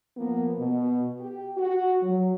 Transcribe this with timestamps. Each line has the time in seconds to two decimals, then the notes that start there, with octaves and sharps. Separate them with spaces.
0.17 F3 A#3 B3
0.58 B2
1.20 G4
1.57 F#4
2.02 F#3